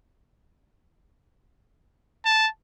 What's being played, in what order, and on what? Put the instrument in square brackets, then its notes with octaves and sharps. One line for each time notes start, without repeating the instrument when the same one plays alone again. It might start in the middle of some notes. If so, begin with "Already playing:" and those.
[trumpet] A5